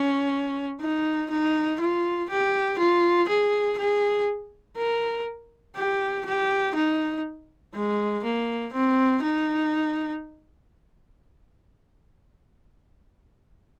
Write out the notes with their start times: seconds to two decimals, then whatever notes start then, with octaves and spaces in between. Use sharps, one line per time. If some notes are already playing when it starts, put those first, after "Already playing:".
Already playing: C#4
0.81 D#4
1.30 D#4
1.80 F4
2.29 G4
2.79 F4
3.28 G#4
3.77 G#4
4.77 A#4
5.76 G4
6.25 G4
6.75 D#4
7.74 G#3
8.23 A#3
8.73 C4
9.23 D#4